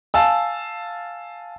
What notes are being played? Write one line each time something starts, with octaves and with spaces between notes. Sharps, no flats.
F5 G#5 A5 E6